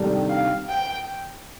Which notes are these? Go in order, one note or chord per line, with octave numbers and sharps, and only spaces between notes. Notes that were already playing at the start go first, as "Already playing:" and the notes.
Already playing: C3 D#3 G3 D4 A4
F5
G5